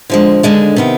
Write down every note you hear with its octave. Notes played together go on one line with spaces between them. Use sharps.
D3 F3 G#3
D#2 D3 G#3 D4
C3 D#3 B3